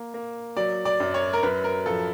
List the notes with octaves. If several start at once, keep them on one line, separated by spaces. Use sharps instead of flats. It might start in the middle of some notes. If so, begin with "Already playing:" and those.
Already playing: A#3
A#3
F#3 D5
D5
F#2
C#5
A#4
F#2 B4
A#4
F3 A4